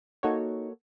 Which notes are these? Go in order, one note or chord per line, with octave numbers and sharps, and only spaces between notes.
A#3 D#4 F#4 A4 C#5